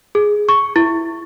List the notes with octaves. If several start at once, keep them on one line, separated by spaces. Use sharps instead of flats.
G#4
C#6
E4